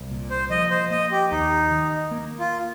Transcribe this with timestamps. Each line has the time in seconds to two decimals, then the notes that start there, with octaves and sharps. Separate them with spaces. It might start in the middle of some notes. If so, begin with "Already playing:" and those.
Already playing: C2
0.11 A#2
0.30 C5
0.51 F3 D#5
0.71 C5
0.90 A#3 D#5
1.11 G4
1.31 D#2 D#4
1.71 D#3
2.11 A#3
2.39 F4